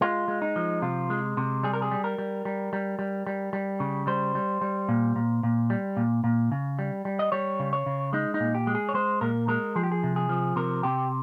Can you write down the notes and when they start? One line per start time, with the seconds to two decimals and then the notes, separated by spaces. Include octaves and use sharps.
0.01 G#3 F4
0.28 G#3
0.42 D#4
0.56 F3
0.82 C3 F4
1.10 G#3
1.37 C3
1.63 G3 G#4
1.73 A#4
1.82 G#4
1.92 G3
2.04 A#4
2.18 G3
2.45 G3
2.73 G3
2.99 G3
3.27 G3
3.53 G3
3.80 C#3
4.07 G3 C5
4.35 G3
4.61 G3
4.89 A#2
5.16 A#2
5.43 A#2
5.70 G3
5.97 A#2
6.24 A#2
6.52 C#3
6.79 G3
7.05 G3
7.19 D#5
7.32 G3 C#5
7.60 C#3
7.73 C#5
7.86 C#3
8.13 G#3 D#4
8.34 D#4
8.40 A#2
8.55 G4
8.67 G#3
8.75 G#4
8.89 C#5
8.94 G#3 C5
9.21 A#2 A#4
9.48 G#3 A#4
9.76 F3 G#4
9.83 G4
9.92 G#4
10.03 C3
10.16 G#4
10.29 F3
10.56 C3 A#4
10.83 C3 G4